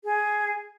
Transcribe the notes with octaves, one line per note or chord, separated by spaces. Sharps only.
G#4